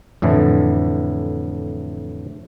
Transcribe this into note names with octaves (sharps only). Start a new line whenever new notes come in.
F2 A2 D3 E3